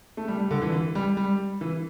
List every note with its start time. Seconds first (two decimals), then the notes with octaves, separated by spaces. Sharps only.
0.17 A3
0.28 G3
0.39 G3
0.51 D3
0.62 E3
0.72 E3
0.95 G3
1.17 G3
1.61 E3